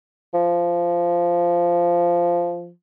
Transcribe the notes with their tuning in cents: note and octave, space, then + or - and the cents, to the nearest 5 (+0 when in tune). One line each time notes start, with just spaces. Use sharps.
F3 -10